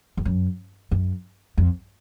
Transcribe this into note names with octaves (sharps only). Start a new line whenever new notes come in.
F2
F#2
F#2
F2